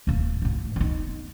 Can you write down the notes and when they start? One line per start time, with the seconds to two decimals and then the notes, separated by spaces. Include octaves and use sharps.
0.07 D1 A#3
0.42 A1 D2
0.76 B3 D#4